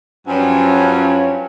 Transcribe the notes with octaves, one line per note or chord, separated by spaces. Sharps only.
G2 F3 F#3 C#4